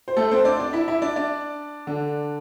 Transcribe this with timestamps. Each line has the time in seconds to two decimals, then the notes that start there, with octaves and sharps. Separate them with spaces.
0.08 C5
0.17 A3 A4
0.31 C4 C5
0.45 D4 D5
0.59 D4 D5
0.73 E4 E5
0.88 E4 E5
1.02 D4 D5
1.16 D4 D5
1.87 D3 D4